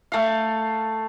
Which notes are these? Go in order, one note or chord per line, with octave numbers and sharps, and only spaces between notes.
A3 F5